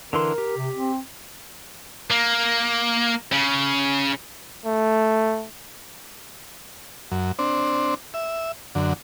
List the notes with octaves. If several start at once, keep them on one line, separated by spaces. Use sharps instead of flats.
D3 E3 A#4 C6
G4
C3
C4
A#3
C#3
A3
F#2
C4 D4
E5
F#2 D3